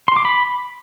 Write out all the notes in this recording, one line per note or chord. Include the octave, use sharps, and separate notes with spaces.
C6
D6
B5